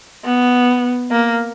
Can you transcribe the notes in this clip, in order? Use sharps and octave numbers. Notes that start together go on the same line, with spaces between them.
B3
A#3